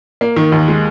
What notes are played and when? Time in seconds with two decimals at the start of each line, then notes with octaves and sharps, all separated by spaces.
0.21 A#3
0.36 D#3
0.52 D#2
0.68 G#3